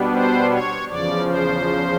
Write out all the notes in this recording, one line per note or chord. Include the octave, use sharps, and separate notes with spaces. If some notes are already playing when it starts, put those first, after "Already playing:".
Already playing: B2 G3 B3 D4
C5
C#5
E2 C#3 F3 D5
C5